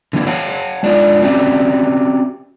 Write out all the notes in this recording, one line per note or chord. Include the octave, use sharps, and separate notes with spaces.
D3 E3 A#3 C4 E4
C#5 F5 F#5 A5
G#3 D4 D#4 F4 D5
C4 C#4 F#4 G4 D5 E5